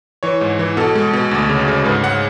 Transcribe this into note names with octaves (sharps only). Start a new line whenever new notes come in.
E3 C#5
G#2
E3
B2 A4
G#3
B2
D2
C#3
C#3
G#2 B4
G#2 F#5